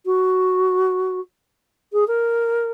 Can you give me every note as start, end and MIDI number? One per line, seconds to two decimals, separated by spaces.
0.05 1.20 66
1.92 2.06 68
2.07 2.72 70